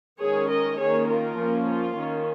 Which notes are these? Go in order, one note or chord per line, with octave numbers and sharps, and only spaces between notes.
D#3 G#3 C#4 G#4 C#5
A#4 D#5
D#3 A#3 C#4 G#4 C#5
F4 A#4
F3 A#3 C#4
F4
D#3 C#4